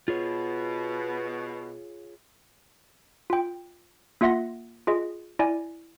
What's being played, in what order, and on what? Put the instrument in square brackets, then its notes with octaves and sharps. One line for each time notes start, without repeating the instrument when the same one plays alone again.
[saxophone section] B2 [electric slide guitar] F4 G#4 C#5
[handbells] F4 G5
A#3 F4 E5 F#5 C6 A#6
F4 G#4 D#5
E4 D5 G#5